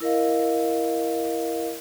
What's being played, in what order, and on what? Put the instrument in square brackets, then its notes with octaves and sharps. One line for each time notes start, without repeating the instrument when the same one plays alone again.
[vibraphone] E4 A#4 D#5 F5